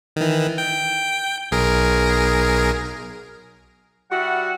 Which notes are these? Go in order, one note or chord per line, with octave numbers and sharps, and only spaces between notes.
D#3 E3
G5
B1 G#4 A#4
G3 E4 F#4 F#5